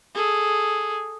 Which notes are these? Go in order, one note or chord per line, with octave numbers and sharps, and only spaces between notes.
G#4 A4